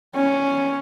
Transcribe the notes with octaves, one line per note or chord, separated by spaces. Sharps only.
C#4